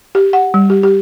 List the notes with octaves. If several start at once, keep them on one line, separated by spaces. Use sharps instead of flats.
G4
F#5
G3
G4
G4